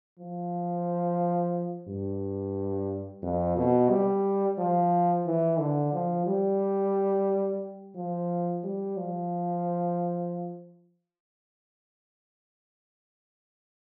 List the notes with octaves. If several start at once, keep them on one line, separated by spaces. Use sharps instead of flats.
F3
G2
F2
B2
G3
F3
E3
D3
F3
G3
F3
G3
F3